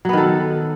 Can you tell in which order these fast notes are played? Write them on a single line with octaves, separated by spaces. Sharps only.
F#3 B3 D#3 A4